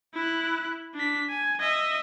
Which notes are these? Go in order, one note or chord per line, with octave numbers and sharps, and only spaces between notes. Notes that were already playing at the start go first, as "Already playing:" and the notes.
E4 F#6
D4 B6
G#5
D#5 E5